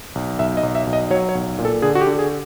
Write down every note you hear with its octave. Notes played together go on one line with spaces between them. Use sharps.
B1
B1 E5
D#5
B1
E5
B1
D#5
F#3 C#5
C#5
B1
A#2
A4
D3 G#4
F#4
G4
D3
G#4